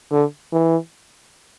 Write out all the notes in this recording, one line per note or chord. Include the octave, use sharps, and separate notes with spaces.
D3
E3